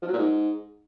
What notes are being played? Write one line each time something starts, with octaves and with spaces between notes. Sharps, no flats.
F3
F#3
A#2
G#2